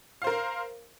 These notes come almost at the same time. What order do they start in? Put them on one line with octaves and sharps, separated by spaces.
F5 C5 A#4